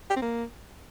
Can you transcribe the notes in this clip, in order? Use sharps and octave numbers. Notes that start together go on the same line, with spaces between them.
G4
C4
A#3